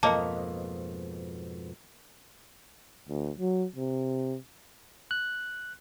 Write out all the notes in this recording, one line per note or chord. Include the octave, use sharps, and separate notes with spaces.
F2 G#2 B2 F#3 A#3 D#5 F#5 A5
D2
F#3
C3
F#6